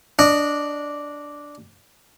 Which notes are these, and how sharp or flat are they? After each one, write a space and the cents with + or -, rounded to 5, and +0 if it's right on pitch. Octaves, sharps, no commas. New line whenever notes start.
D4 -5 D#5 -20